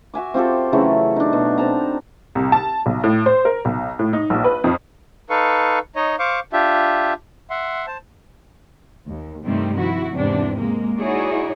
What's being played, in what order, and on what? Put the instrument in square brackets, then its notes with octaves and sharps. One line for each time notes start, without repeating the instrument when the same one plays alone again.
[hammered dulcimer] F#4 E5 G#5 D6
C4 F4 G4 A4
C#3 E3 F#3 A3
D4 D#4
B2
C4 A4 A5 A#5
[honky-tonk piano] C2
A5
B1
A2
C5
A#4
B1
A2
D#4
A#1
B4
F2
[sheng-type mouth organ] D#4 A4 B4 F5 C#6
D#4 C#5 D#5
C5 F5 C#6 D6
D4 F4 G4 E5
E5 F#5 C6
C5 A5
[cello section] D#2
G2 C3 D#3 G3 A3 C4
F3 E4 F#4
E2 G#2 C3 E3 D4
G#3 A#3
D#4 E4 F#4 G#4 C#5 D5